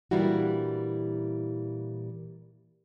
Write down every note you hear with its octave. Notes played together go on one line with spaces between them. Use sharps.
A#2 E3 G3 D4 E4 F#4